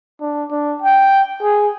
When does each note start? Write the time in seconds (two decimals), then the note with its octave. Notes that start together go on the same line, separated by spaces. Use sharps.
0.21 D4
0.51 D4
0.82 G5
1.43 G#4